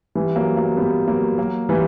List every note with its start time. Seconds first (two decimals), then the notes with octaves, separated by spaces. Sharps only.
0.15 E3 G3
0.36 F#3 A#3
0.57 F#3 A#3
0.77 G3 B3
1.08 F#3 A#3
1.38 F#3 A#3
1.69 E3 G3